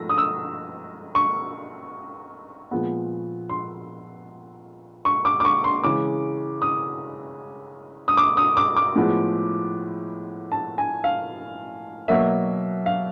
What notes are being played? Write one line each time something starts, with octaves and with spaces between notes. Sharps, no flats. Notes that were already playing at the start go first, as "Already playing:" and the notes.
Already playing: G#2 F3 A3 A#6
D#6
E6
C#6
A#2 F3 G#3 B3
C6
C#6
D6
D6
C#6
C6
C#3 E3 G#3 D6
D#6
D#6
D6
D#6
D6
D6
A2 F3 G#3 B3
A5
G#5
F5
B2 F#3 A#3 E5
F5